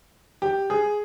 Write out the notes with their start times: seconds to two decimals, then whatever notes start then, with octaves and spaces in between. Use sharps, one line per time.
0.42 G4
0.70 G#4